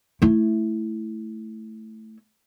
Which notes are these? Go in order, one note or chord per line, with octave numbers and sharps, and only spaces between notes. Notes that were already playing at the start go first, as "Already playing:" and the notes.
A3 E4